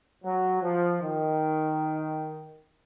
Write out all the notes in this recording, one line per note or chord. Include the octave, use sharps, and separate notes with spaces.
F#3
F3
D#3